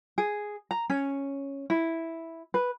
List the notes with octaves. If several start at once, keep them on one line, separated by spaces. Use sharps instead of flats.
G#4
A#5
C#4
E4
B4